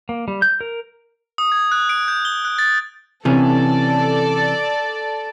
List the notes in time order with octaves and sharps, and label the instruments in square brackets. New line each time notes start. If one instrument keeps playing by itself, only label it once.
[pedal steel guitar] A#3
G3
G6
A#4
[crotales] D#6
G#6
F#6
D7
G6
G7
F#6
A6
[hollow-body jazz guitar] C3 E3 C#4 [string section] A4 D5